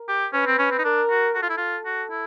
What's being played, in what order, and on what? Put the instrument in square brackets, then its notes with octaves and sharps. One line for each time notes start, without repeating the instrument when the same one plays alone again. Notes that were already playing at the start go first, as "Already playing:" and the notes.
Already playing: [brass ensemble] A#4
[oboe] G4
[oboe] C#4 [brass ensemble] B4
[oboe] C4
C#4
C4
D#4
[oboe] D4 [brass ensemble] A#4
[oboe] F#4
[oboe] F#4 [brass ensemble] A4
[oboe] F4
E4
F4
F#4
E4